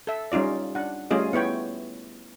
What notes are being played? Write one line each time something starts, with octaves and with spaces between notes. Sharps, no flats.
A4 E5
G3 C#4 D#4 F4 D5
D4 F#5
G3 A3 C#4 F4 G#4 D#5
B3 E4 C#5 G5